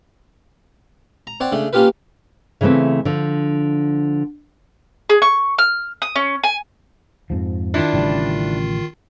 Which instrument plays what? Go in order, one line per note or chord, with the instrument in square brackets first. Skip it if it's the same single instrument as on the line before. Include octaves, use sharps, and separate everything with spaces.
[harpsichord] A#5
C4 C#5 D5 F#5
C#3 A3 D4
A#3 C#4 F4 G4 A#4 B4
[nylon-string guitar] C#3 E3 A3 B3 C4
D3 F3
[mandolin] G#4
C#6
F6
D#6
C#4
G#5
[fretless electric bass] F2 G#2 F3
[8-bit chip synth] D#3 F4 C7 [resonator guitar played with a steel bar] D4 E4
[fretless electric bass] A1 C#3 G3